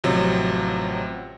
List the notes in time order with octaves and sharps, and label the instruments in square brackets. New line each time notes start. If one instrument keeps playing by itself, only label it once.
[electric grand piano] A1 C3 F3 F#3